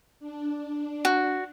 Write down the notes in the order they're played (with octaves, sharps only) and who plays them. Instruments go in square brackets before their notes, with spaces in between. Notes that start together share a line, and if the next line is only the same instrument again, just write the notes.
[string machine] D4
[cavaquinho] F#4